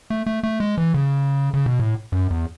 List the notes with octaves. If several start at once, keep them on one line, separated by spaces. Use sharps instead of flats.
A3
A3
A3
G#3
E3
C#3
C#3
B2
A2
F#2
E2